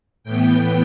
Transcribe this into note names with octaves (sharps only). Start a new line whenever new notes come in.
A2 E3 B3 G5